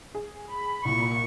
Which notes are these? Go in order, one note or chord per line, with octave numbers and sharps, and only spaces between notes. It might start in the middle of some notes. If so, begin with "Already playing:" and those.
G#4
B5
C2 A#2 C#6